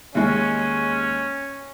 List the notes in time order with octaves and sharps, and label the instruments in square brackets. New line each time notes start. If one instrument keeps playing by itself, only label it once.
[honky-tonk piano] D#2 G#3 [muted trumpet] C#4